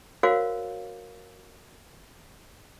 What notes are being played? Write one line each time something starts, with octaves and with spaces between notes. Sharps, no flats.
F#4 A#4 C5 C#5 F5